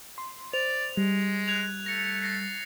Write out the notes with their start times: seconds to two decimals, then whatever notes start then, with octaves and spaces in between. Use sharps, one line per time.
0.18 C6
0.53 C5 D5 F7
0.97 G3 G#3
1.48 F#6 G#6 F7
1.86 A3 A#6 C#7
2.22 A6 A#6 C7